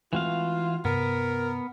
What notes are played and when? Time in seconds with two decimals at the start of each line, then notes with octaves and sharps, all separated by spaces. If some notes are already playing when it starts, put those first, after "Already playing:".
0.13 E3 G#3 A3 C4 F4 F#4 F5
0.85 G2 C3 B3 A#4